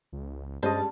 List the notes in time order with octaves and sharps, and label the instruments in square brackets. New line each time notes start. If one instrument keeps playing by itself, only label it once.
[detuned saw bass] C#2
[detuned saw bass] G2 [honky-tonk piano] G3 G#3 C#4 [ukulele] C5 D#5 [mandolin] A5